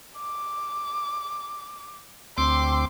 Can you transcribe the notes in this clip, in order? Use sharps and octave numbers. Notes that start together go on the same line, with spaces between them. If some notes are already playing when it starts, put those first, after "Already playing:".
D6
D2 C4 C6 D6